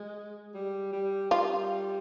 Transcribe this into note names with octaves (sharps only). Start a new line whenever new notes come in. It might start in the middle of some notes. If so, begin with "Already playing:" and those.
Already playing: G#3
G3
G3
G3 F4